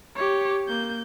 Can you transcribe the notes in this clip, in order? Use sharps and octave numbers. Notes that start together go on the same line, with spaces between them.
G4 C#5
A#3 G6